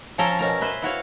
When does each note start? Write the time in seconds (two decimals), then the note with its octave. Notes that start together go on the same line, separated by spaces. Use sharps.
0.18 F3 C#4 A4 G5 G#5 A#5
0.39 B2 C#4 A#4 A#5
0.61 B4 C5 E5
0.82 E4 F#4 C#5 F5